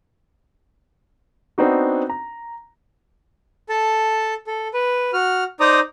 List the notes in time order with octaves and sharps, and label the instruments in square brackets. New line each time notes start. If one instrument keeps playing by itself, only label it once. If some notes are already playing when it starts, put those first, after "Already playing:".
[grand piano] B3 C4 D4 D#4 F#4
A#5
[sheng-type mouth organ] A4 A5
A4
B4
F#4 F6
D#4 C5 D5 A#5 D#6